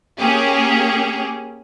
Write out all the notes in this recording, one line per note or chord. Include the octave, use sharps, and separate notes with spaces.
A#3 C#4 G4 G#4